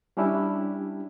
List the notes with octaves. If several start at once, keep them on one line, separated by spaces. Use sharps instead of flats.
G3 C#4 D4 E4 G4